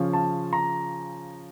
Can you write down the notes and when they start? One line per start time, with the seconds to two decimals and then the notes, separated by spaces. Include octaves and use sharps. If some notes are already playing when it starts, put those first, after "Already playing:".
Already playing: C#3 F3 C#4
0.13 A5
0.53 A#5